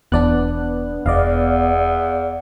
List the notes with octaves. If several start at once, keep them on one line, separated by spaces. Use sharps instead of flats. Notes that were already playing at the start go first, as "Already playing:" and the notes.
E1 E2 B3 D4 D5 F#6
E1 E2 D5 D#5 F5